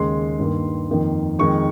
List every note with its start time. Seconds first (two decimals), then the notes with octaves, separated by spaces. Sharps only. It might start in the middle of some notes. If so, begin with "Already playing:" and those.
Already playing: D#2 C#3 G#3 C6
0.39 G2 D#3 A#3
0.89 F2 D#3 A#3
1.39 F2 D#3 G#3 C#6